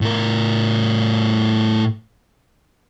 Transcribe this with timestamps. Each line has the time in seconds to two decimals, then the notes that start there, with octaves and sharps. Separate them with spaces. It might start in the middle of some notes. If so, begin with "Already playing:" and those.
0.01 A2 A#4